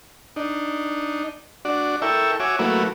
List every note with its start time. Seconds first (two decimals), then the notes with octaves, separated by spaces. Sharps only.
0.36 D4 D#4
1.65 D4 F#4 D5
2.02 E4 A4 A#4 E5 G5 C#6
2.40 F#4 C#5 E5 G#5 D6
2.59 F#3 A3 A#3 E4 F#4 B4